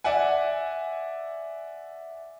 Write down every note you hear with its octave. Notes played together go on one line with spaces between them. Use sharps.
D5 E5 F#5 G#5